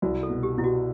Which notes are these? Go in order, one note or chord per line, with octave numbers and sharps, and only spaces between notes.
C2 F#4
A4
B2
G4
B2 E4
F#4